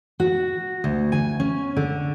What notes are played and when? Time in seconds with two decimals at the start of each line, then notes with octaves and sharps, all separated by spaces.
0.20 F#4
0.84 D2
1.12 G#5
1.40 C#4
1.76 D3